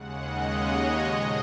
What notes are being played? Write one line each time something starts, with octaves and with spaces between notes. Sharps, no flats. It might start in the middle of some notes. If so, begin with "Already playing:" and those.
Already playing: D#2 C#3 G#3 F#5
D#5
C#5
D#5
A#2 F3 G#3